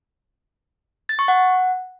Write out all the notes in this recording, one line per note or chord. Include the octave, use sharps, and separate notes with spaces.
A6
C#6
F#5